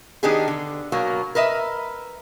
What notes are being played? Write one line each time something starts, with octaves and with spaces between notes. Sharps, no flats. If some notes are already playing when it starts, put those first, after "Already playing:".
D#3 B3 D4 D#4 G4 G#4
D3
B2 F#3 A#3
A#4 B4 D#5 E5